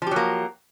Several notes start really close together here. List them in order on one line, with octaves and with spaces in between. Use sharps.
F3 G4 F#3 A#3